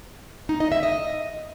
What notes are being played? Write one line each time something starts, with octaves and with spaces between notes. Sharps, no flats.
D#4
D#5
E5
D#5